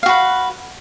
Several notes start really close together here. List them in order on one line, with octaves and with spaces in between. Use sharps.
F5 F#4 B4